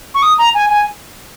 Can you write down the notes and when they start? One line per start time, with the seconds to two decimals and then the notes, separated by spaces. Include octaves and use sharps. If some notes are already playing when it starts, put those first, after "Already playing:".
0.15 C#6
0.22 D#6
0.38 A#5
0.55 G#5
0.70 G#5